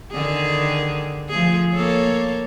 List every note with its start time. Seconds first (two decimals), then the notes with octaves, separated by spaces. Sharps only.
0.12 D3 D#3 G#4
1.30 F3 A3 G#4
1.73 A#3 A4 C#5